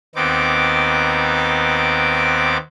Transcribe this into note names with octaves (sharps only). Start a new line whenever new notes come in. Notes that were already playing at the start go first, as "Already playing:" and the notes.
D#2 B3 C4 D#4 D6